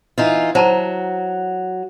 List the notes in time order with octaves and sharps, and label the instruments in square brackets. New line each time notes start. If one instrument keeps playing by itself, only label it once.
[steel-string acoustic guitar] E3 D#4 F4
[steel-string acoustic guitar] F#3 [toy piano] C5 A5 A#5